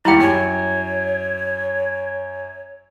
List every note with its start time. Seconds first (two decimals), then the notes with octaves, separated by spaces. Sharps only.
0.05 D#2 G3 E4 G4 G5
0.20 F#2 C#5